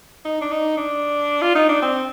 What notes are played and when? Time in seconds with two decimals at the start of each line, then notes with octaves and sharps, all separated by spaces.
0.25 D#4
0.41 D4
0.51 D#4
0.77 D4
1.42 F4
1.55 D#4
1.69 D4
1.82 C4